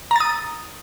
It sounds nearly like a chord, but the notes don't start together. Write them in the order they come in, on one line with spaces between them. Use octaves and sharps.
A#5 A6 D#6